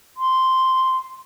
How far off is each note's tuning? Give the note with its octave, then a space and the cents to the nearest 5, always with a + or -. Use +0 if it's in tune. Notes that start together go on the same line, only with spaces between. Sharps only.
C6 -5